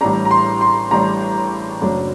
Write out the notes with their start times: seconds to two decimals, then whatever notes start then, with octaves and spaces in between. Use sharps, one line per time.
0.01 A1 A2 G3 D4 A#5
0.25 A#5
0.31 C6
0.61 C6
0.91 A1 A2 G3 D4 A#5
1.82 F#1 F#2 F#3 A3 D4